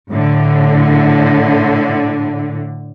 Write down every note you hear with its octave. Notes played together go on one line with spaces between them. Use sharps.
A2 D3